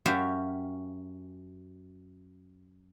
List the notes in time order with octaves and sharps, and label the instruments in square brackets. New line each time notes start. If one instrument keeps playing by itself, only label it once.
[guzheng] F#2 C#4 F#4 G4 E5 F5